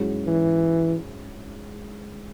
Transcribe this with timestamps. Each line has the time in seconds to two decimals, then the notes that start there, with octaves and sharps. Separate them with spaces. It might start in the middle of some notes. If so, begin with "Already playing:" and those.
Already playing: G#2 F#3 C#4 E4 G#4
0.27 E3